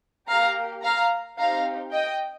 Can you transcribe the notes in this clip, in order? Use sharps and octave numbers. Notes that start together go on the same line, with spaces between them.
A#3 G4 F5 A#5
F5 A#5
C4 D#4 G4 F5 A#5
D#5 G5